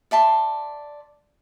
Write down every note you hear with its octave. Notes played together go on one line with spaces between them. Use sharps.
D5 E5 A5 C6